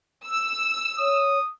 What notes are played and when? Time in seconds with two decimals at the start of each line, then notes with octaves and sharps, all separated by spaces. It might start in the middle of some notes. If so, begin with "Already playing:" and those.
0.26 E6
0.99 C#5 D#6